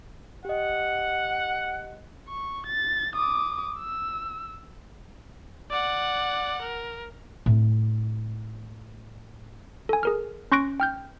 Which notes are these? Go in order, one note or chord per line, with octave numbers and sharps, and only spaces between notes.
G4 D#5 F#5
C#6
A6
D6 D#6
E6
D5 F#5
A#4
A2 C4
A4 G#5
G#4 A#4 F6
C#4 C6 C#6 F#6 A#6 D7
G5 F6 G6